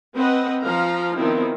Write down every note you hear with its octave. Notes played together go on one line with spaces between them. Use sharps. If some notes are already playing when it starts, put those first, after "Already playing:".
C4 B4 D#5 F#5
F3 F5 A#5
D#3 F3 B3 C4 D#4 E4